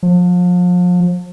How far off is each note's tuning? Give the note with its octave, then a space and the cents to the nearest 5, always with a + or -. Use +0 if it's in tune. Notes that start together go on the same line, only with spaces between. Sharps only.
F3 +35